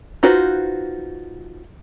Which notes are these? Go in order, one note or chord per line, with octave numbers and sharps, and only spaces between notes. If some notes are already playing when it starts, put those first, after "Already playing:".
D#4 F4 F#4 B4 C5